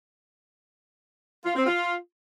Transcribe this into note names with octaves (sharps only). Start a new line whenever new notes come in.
F4
C4
F4